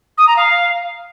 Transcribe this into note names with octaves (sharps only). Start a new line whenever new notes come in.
D#6
A#5
F5